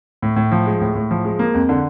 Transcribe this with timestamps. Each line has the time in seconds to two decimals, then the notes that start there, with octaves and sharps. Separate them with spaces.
0.22 A2
0.36 A2
0.52 F3
0.66 G#3
0.81 A2
0.95 A2
1.11 F3
1.25 G#3
1.39 A#3
1.54 F2
1.69 D3